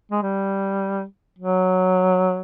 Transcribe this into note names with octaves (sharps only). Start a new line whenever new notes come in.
G#3
G3
F#3